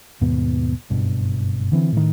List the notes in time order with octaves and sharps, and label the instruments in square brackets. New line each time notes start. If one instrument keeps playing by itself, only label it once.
[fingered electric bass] D#2 G#2 B2 B3
F#1 G2 B2
D3 E3 C4
A2 D#3